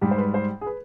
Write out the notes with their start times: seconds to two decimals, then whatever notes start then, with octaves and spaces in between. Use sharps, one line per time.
0.01 G#2 G3 G4
0.11 C5
0.18 B4
0.34 C5
0.61 G#4
0.66 B4